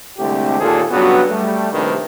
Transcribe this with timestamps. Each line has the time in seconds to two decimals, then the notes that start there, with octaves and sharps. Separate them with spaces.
0.17 C2 D3 G#3 A3 C4 G4
0.59 D#2 A#2 F4 G#4 A4
0.91 G2 C#3 F#3 B3 F#4
1.29 G3 A3
1.73 A#1 G2 C3 D#3 A3 B4